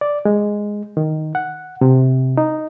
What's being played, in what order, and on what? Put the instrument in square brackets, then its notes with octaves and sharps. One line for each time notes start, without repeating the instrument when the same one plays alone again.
[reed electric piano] D5
G#3
D#3
F#5
C3
D#4